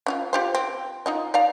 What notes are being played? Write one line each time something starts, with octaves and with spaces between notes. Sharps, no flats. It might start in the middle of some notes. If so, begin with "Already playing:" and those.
C#4 D#4 F4
F4 G4 C5
C4
D#4 F4 D#5
D5 F5 A#5